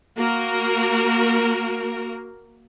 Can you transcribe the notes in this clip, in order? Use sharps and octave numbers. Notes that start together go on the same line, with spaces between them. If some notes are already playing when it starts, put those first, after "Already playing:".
A#3 F#4 A#4